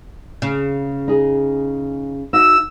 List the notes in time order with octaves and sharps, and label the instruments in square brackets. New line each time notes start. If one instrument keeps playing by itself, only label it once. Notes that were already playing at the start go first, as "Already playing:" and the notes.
[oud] C#3
[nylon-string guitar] D#4 G#4
[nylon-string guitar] D#4 F#4 E5 [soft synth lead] E6